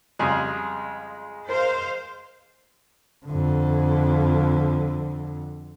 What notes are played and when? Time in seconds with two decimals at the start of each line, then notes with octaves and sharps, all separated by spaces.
0.19 F2 C#3 G3 G#3
1.49 A#4 C5 F5
3.26 F2 D3